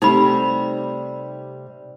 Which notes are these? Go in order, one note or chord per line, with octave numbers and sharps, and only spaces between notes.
C3 G3 A3 D#4 B5